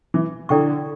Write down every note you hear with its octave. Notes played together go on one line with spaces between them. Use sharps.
E3
D3 E4 A4 D5 G5 C#6